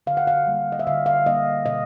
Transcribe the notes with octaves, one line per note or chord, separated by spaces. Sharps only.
D3 F5
F#5
F5
G3 A#3
D#5
E5
D3 F5
F5
G3 A#3 D#5
B2 D#5